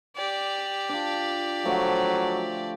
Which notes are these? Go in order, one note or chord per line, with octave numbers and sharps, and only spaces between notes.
G4 D5
D4 F4
D3 F3 F#3 A3